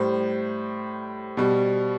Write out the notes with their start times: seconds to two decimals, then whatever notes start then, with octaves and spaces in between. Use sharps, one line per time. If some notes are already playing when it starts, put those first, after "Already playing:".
Already playing: A2 G3 C5
1.37 B2 G3